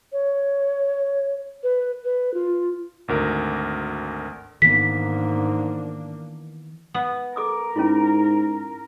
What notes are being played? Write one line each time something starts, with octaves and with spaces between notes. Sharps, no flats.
C#5
B4
B4
F4
G#1 D2 A#4
G#2 D#3 E3 A#3 B3 D4 B6
B3
A4 A#4 D6 D#6
G#2 C#4 E4 F4